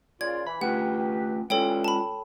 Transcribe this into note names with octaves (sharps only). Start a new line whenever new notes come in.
A#2 C#3 F4 D5 G#6
E3 B5
A3 C#4 F4 G4 B4 F#5
E3 G3 G#3 C#4 F4 A4 C#5 G5
A5 B5